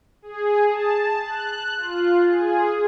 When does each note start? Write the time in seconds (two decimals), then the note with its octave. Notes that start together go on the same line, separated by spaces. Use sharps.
0.22 G#4
0.68 A5
1.21 F#6
1.77 F4
2.28 G#4